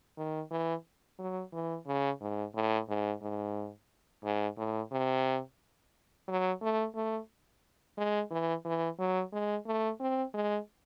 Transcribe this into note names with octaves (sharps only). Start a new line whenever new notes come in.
D#3
E3
F#3
E3
C#3
G#2
A2
G#2
G#2
G#2
A2
C3
F#3
A3
A3
G#3
E3
E3
F#3
G#3
A3
C4
G#3